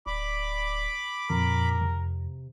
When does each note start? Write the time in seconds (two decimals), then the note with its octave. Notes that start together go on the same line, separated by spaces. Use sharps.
0.07 D1 D5 B5 D6
1.30 F2 A#2 A#4
1.81 C3